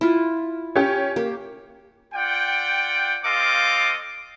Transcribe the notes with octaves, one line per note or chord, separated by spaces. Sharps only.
E4 F4
C#4 G4
A#3 G4
F4 D5 F#5 G5
C4 F4 A4 D#5 F5 D6